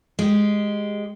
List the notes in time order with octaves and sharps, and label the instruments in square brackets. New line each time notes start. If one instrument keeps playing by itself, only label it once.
[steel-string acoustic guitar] G#3 G4